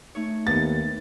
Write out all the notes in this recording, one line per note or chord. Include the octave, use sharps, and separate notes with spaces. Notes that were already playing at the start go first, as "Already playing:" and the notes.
A3 D#4 C#5
D#2 B3 B4 A6